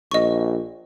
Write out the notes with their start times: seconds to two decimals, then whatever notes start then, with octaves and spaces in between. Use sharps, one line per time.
0.11 A#1 D#5 C#6